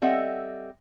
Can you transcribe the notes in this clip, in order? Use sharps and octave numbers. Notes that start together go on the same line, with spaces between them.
G3 C4 A4 D#5 E5 F#5